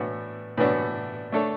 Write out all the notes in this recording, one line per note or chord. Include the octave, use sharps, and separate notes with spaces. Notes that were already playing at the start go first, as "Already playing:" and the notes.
Already playing: A2 E3 B3 D4 F#4
A2 E3 B3 D4 F#4
A3 D4 A4 C#5